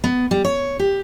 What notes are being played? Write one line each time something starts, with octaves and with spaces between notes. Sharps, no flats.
B3
G3
C#5
G4